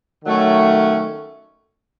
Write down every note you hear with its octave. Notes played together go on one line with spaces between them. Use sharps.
D#3 F#3 A3 C#4